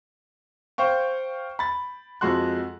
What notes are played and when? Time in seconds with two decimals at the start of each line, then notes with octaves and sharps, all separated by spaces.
0.78 C5 F5 G5 C#6
1.59 B5 A6
2.21 F2 G#3 F#4 C6 F#6